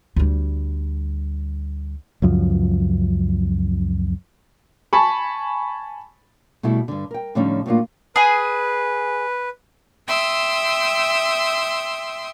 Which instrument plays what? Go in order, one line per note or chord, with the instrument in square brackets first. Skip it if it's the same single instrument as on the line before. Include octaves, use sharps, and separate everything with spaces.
[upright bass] D2 G3
[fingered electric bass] C#2 F#2 F3
[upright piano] G#5 A5 B5 C#6
[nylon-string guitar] B2 G3 A3 E4 A4
G2 D3
A#4 G5
A2 D3 F3 G3 C#4 D#4
A2 F#3 A3 A#3 D4 F4
[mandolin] G#4 G#5 [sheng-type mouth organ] B4
[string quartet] E5 G5 C6 D#6 E6